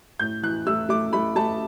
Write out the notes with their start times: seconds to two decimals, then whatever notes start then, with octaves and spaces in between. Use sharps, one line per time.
0.19 A2 G6
0.42 E3 F#6
0.67 A3 E6
0.89 A3 D6
1.13 A3 B5
1.36 A3 A5